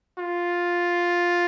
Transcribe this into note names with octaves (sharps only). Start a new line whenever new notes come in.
F4